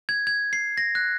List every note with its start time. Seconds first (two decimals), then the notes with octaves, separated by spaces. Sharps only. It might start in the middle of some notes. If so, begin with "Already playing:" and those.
0.09 G#6
0.27 G#6
0.53 C7
0.78 A#6
0.95 F#6